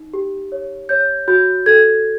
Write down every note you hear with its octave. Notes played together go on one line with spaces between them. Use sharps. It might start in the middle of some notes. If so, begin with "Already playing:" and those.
Already playing: D#4
G4
C#5
C#5 G6
F#4 G6
A4 G#6